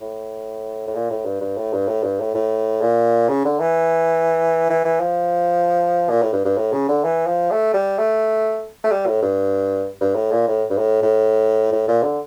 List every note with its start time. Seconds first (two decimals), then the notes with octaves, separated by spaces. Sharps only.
0.01 A2
0.87 A2
0.95 A#2
1.10 A2
1.26 G2
1.41 G2
1.58 A2
1.73 G2
1.88 A2
2.04 G2
2.20 A2
2.35 A2
2.82 A#2
3.29 C#3
3.45 D3
3.61 E3
4.70 E3
4.85 E3
5.00 F3
6.10 A#2
6.22 A2
6.33 G2
6.45 G2
6.58 A2
6.73 C#3
6.89 D3
7.04 E3
7.27 F3
7.51 A3
7.74 G3
7.98 A3
8.84 A3
8.91 G3
9.07 A2
9.22 G2
10.01 G2
10.16 A2
10.32 A#2
10.48 A2
10.70 G2
10.78 A2
11.03 A2
11.72 A2
11.88 A#2
12.03 D3